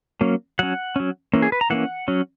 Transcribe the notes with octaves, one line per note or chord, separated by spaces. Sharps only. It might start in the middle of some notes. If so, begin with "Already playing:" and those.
F#3 A#3 C#4
F#3 C#4 F#5
F#3 C#4
E3 A#3 C#4
G#4
B4
A#5
E3 A#3 C#4 F#5
F#3 C#4